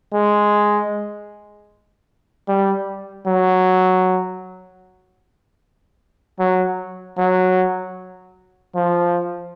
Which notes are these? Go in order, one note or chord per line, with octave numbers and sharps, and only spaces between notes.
G#3
G3
F#3
F#3
F#3
F3